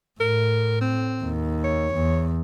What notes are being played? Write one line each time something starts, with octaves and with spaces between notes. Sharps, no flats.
A2 A#4
C4
D#2
C#5
E2